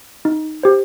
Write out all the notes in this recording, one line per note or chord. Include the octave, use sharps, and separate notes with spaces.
D#4
G4 C5